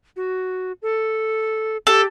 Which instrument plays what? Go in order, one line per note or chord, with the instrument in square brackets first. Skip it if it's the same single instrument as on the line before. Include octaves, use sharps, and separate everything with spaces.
[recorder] F#4
A4
[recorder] G4 [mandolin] A4